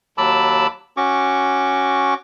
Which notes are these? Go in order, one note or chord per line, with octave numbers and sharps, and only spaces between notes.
D#2 F#3 A5 B5 D6 E6
C#4 F#4 C#6 D6